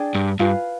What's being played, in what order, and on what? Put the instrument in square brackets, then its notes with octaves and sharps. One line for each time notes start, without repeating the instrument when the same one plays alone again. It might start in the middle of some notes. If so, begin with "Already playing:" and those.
Already playing: [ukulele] D4 G#4 D5 G5
[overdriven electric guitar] G2
[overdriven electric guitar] G2 [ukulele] F4 B4 F5 G#5